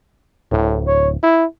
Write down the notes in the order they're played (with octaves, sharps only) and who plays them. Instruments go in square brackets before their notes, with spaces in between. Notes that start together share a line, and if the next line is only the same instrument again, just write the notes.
[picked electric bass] D1 [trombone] A2
[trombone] C#5
E4